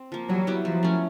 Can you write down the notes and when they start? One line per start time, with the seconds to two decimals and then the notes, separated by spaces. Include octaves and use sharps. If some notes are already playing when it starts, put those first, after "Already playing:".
Already playing: C4
0.12 F3 A#3
0.29 F#3 G3
0.47 B3 E4 G4
0.65 F3 F#3
0.83 A3 C#4